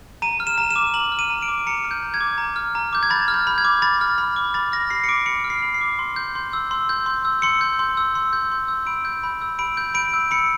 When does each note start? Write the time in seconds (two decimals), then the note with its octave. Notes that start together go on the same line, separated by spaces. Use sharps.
0.22 A#5 D#7
0.40 F6
0.47 E7
0.58 A#5
0.71 E7
0.76 D6
0.94 A#5 F#7
1.12 F6
1.19 D#7
1.30 A#5
1.42 D7
1.48 D6
1.66 A#5 C#7
1.84 F6
1.91 G6
2.02 A#5
2.14 G#6
2.21 D6
2.38 A#5
2.56 F6
2.75 A#5
2.93 D6 G6
3.03 G#6
3.10 B5 A6
3.28 F6
3.34 G6
3.47 B5
3.58 G#6
3.65 D6
3.82 B5 A6
4.01 F6
4.18 B5
4.36 D6
4.54 B5 A6
4.72 F6 A#6
4.90 B5 C7
5.04 C#7
5.08 D6 D7
5.26 B5 C#7
5.44 F6
5.50 C7
5.62 B5
5.74 C7
5.81 D6
5.99 C6
6.16 G6
6.35 C6
6.53 E6
6.71 C6
6.89 G6
7.06 C6
7.25 E6
7.42 C6 C#7
7.61 G6
7.79 C6
7.97 E6
8.15 C6
8.33 G6
8.51 C6
8.68 E6
8.87 B5 D7
9.05 G6
9.24 B5
9.42 E6
9.59 B5 D7
9.77 G6
9.94 B5 D7
10.14 E6
10.31 B5 C#7